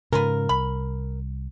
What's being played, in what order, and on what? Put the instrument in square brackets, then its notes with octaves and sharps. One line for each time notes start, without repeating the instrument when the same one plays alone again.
[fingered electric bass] G#2 C#3 [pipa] C#4 F4 B4 [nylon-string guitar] A#4
[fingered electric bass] C2 [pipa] B5